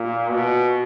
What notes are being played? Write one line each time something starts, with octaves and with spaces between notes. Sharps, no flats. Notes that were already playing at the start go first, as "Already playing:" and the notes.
Already playing: A#2
B2